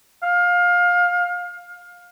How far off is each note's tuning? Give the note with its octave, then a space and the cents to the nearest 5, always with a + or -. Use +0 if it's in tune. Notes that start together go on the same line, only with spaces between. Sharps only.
F5 +25